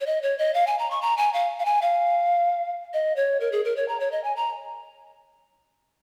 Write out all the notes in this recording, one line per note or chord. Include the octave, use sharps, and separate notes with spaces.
C#5
D#5
C#5
D#5
F5
G#5
A#5
C#6
A#5
G#5
F5
F5
G#5
F5
D#5
C#5
A#4
G#4
A#4
C#5
A#5
C#5
D#5
G#5
A#5